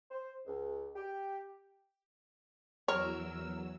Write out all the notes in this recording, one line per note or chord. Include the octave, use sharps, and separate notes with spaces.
C5
C#2
G4
E2 F#3 A#4 C#5 E6